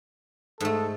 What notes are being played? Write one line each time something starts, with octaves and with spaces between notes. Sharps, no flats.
G#2 A3 A4